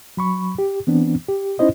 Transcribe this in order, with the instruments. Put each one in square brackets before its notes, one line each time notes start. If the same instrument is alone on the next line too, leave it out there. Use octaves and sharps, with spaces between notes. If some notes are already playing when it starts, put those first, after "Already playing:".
[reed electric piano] F#3 B5 C#6
G4
E3 B3 C4 D4
G4
C#4 D#4 E4 C5 D#5